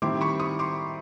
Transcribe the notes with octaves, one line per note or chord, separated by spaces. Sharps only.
D#3 G3 C4 E4 C6 D6
B5 C#6
C#6 D#6
C6 D6